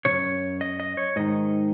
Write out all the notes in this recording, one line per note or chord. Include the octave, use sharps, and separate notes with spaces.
F#2 C#3 C#5
D#5
D#5
C#5
G#2 D#3 D#5